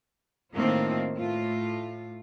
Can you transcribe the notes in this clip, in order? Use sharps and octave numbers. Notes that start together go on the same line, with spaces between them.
A2 D#3 A3 A#3 C4 F4
A2 F4